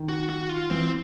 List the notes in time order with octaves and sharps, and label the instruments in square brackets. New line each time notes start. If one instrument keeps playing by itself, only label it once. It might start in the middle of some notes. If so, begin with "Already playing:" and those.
Already playing: [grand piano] D#3
[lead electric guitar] F#4
F#4
F4
[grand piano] E3 [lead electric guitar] C4